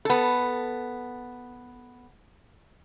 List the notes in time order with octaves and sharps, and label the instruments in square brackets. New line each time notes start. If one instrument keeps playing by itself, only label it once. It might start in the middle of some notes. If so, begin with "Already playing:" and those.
[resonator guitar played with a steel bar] B3 A4